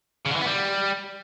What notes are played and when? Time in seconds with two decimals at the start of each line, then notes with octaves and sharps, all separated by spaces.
0.25 C#3
0.30 D3
0.36 E3
0.41 B3
0.46 G3